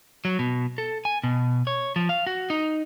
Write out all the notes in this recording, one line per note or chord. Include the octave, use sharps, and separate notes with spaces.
F#3
B2
A4
G#5
B2
C#5
F3
F5
F#4
D#4